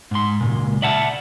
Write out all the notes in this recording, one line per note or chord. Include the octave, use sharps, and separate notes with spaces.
G#2 C6
C#2 G2 A#2
D5 E5 F#5 A5